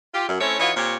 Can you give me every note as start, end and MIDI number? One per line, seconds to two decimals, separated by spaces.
0.15 0.26 65
0.15 0.26 67
0.28 0.36 42
0.40 0.58 57
0.40 0.58 60
0.40 0.58 61
0.40 0.58 64
0.40 0.58 73
0.60 0.71 52
0.60 0.71 63
0.60 0.71 65
0.60 0.71 66
0.60 0.71 73
0.76 0.97 46
0.76 0.97 60
0.76 0.97 67
0.76 0.97 73